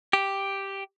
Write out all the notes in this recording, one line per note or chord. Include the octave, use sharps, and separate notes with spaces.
G4